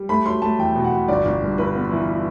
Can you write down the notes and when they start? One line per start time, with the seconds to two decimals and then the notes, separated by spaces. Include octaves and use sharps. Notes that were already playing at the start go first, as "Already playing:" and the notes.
Already playing: G3
0.09 A3 B5
0.26 F#3 C6
0.42 A3 A5
0.59 E2 G5
0.76 B2
0.84 F#5
0.92 B2
1.08 G1 D5
1.25 G1
1.42 G2
1.58 G1 B4
1.75 B3
1.91 E3